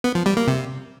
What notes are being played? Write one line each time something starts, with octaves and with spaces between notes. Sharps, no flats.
B3
F3
G3
A#3
C3